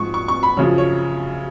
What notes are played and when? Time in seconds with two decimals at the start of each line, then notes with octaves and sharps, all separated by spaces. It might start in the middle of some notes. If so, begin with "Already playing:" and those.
Already playing: G#2 F3 C#6
0.14 C#6
0.28 C#6
0.43 B5
0.57 F#2 C#3 F3 C#5
0.78 C#5